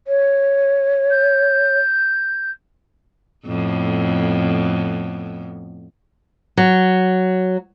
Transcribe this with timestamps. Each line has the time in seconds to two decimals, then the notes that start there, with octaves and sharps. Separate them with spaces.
0.08 C#5
1.10 G6
3.47 F2 A2 B3
6.57 F#3